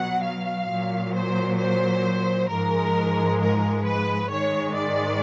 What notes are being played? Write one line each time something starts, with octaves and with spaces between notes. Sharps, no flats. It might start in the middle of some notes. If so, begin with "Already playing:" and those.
Already playing: B2 F#3 F#5
F5
A#2 F#3
C5
C5
G#2 F3 G#3 A#4
A#4
B4
G#2 D#3 G#3 C#5
D5